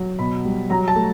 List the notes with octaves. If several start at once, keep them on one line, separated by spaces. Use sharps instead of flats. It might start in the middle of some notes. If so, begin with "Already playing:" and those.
Already playing: F#3
B2 B5
G3
F#3 A#5
A5
A3